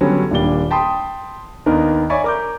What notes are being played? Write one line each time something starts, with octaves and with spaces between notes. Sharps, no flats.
D3 F#3 G3 B3 C#4
D#1 A#2 G3 D4 G7
G5 A5 B5 C6 D#6
D#2 D#3 B3 D4 A#4 D#5
C#5 D5 E5 G#5 B5 C#6
A#4 D6 G6